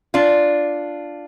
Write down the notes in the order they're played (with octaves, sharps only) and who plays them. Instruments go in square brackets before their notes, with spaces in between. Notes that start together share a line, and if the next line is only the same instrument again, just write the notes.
[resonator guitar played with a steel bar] D4 F4